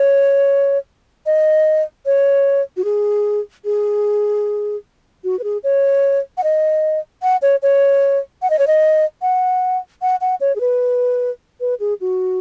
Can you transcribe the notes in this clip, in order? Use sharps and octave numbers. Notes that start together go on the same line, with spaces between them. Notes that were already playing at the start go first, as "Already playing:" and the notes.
Already playing: C#5
D#5
C#5
F#4
G#4
G#4
F#4
B4
G#4
C#5
F#5
D#5
F#5
C#5
C#5
F#5
D#5
C#5
D#5
F#5
F#5
F#5
C#5
G#4
B4
B4
G#4
F#4